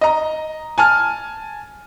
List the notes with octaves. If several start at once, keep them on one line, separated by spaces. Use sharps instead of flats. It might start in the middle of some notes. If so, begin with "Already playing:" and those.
D#5 A#5
G#5 A5 F6